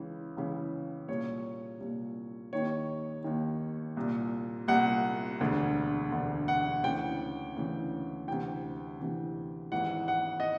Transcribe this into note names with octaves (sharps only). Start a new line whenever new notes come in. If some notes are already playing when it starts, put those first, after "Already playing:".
Already playing: C#2 C#3 E3
C#2 C#3 E3
C2 A#2 C#5
C2 A#2
D#2 D#3 C#5
D#2 D#3
C2 A#2
C2 A#2 F#5
E1 D2 D3
E1 D2 D3
F#5
D2 C#3 E3 G5
D2 C#3 E3
D2 C3 E3 G5
D2 C3 E3
G#1 G#2 E3 F#5
F#5
D#5